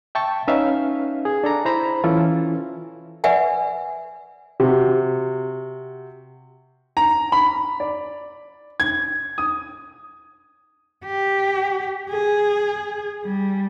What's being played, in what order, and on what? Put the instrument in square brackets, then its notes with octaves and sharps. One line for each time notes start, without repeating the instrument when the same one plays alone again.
[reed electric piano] E5 G5 A5 C#6
C#4 D#4 B4 E5 F5
G#4
D4 A4 A#5
E4 C5 A#5 B5
E3 C#4 E4 F4 A4
[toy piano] B4 D5 E5 F#5 G#5
[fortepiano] C3 F#4
[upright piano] A#5
B5
D5
G#6
D#6
[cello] G4
G#4
G3